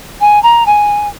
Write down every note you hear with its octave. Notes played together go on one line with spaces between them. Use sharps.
G#5
A#5
G#5